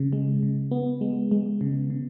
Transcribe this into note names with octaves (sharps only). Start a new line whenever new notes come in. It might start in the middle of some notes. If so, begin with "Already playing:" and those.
Already playing: C#3
G#3
C#3
B3
G#3
G#3
C#3
C#3